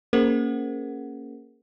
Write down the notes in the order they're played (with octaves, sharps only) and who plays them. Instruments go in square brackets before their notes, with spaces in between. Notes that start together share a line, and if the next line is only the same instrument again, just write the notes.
[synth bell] A#3 C#4 G#4 A#4 C5 F#5